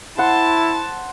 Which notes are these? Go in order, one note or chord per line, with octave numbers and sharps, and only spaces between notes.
E4 C5 F#5 A5 C6